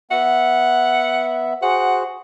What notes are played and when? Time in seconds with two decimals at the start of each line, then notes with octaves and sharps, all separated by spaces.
0.11 B3 E5 F#5
1.62 F#4 G#4 C5 F#5